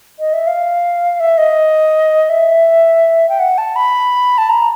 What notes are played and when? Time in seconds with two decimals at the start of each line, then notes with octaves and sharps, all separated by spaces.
0.19 D#5
0.33 E5
0.47 F5
1.20 E5
1.38 D#5
2.30 E5
3.29 G5
3.39 F#5
3.58 A5
3.76 B5
4.38 A5
4.49 A#5